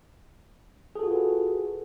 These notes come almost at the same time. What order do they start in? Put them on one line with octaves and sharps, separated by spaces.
G#4 A4 F#4 F4 B4